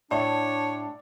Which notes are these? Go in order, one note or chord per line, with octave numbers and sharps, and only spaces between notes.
A2 D4 C#5 D5 E5